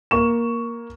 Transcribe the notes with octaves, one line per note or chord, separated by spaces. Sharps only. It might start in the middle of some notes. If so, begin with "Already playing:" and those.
A#3 C#6 E7